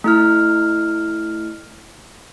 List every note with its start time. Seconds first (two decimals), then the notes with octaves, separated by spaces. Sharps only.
0.04 A3 E4 F6